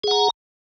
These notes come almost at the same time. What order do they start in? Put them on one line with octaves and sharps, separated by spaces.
G#4 F#5 A#5